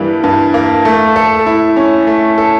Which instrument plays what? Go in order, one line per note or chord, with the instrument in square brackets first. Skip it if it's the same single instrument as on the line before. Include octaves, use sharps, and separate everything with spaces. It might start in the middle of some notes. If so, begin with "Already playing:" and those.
Already playing: [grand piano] G2 E3 G3 A#3
G2
A#3
A3
A4
E4
C#4
A3
A4